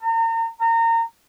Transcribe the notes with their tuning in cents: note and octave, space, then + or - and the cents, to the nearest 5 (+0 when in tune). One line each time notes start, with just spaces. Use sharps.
A#5 -40
A#5 -30